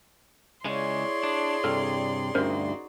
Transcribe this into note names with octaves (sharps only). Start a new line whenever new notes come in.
C#3 G#3 E4 G#4 C#5 D5 C6
D4
G2 C3 A4 F6
D2 G2 C#4 D#4 F#4 A#4 C5